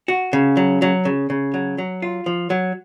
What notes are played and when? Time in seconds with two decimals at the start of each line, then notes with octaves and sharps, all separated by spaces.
0.08 F#4
0.33 C#3
0.57 F#3
0.82 F#3
1.05 C#3
1.30 C#3
1.54 F#3
1.78 F#3
2.02 F4
2.26 F3
2.50 F#3